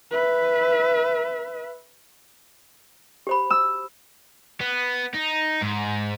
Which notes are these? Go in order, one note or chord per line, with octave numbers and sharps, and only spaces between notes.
B4 E5
G4 C5 B5
E6
B3
D#4
G#2